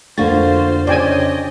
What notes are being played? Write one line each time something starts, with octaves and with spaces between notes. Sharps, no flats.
F2 D3 A#3 D4 F4 F#4 C5 A6
C#3 G4 C5 D5 D#5 G5 G#5